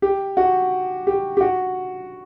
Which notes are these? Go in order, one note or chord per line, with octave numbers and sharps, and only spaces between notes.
G4
F#4
G4
G4
F#4